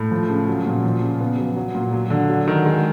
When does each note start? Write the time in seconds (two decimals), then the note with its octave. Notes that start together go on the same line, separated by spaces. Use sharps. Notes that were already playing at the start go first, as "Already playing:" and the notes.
Already playing: A2
0.11 F3
0.29 C#3
0.48 F#3
0.66 A#2
0.84 F3
1.02 C#3
1.20 B3
1.38 F#3
1.56 F#3
1.75 A#2
1.93 F#3
2.10 D3
2.29 F#3
2.48 D#3
2.66 G#3